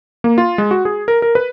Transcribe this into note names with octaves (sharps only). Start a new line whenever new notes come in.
A#3
F4
G#3
F#4
G#4
A#4
A#4
B4